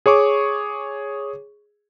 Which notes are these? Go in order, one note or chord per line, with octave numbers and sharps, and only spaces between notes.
G#4 C#5 C#6 D6